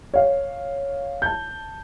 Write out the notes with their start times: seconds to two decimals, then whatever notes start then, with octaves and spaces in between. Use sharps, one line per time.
0.14 C#5 F5
1.22 A5 G6